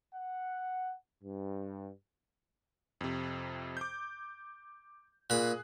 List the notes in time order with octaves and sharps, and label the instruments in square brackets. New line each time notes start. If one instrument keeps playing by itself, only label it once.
[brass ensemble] F#5
G2
[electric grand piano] F2 C3
D6 G6
[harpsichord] A#2 B5 [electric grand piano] G#4 F#6